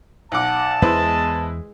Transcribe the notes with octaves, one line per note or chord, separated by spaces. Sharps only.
B1 F#5 A5 D6
E2 G#3 B3 E4 B4 C5